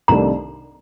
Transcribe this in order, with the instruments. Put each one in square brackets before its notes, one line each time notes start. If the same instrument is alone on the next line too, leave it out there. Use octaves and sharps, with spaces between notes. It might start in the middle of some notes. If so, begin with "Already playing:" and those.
[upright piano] C2 C3 D#3 A3 D4 [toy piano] A#5